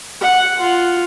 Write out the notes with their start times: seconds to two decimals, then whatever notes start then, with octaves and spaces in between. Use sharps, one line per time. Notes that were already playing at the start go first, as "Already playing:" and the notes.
0.21 F#5
0.60 F4